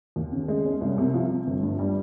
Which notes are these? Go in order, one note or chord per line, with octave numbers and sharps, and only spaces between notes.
D#2
C#3
G#3
C#4
C2
C3
F3
C4
G1
G2
G3